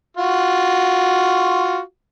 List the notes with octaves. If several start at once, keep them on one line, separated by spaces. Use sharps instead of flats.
F4 F#4